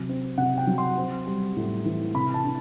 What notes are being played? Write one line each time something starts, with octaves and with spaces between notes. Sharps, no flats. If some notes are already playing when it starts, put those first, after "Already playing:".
Already playing: C3 F#3
C4
C3 F#5
G5
F#3
C6
C4
G3
A2
E3
C3 B5
A5
D4